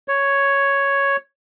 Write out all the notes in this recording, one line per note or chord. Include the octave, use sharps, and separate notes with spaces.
C#5